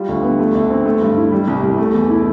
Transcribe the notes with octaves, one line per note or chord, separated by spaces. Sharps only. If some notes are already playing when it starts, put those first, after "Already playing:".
Already playing: G3 F4
D2
B3
A3
D2
C4
A3
G2
E4
G3
C2
C2
A3
E2
E4